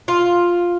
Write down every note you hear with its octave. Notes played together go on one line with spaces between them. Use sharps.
F4